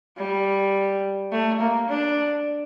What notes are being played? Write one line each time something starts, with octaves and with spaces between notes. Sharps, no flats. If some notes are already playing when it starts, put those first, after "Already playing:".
G3
A3
A#3
D4